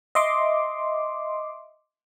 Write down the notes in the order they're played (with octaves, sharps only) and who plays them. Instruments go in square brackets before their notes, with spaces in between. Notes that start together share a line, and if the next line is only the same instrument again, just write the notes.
[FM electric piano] D#5 E5 C6 D6